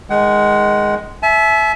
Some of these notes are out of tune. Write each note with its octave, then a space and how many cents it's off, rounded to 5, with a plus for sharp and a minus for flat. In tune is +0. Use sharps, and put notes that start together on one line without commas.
D#3 +10 G#3 +0 F#5 +30
E5 +0 A5 -45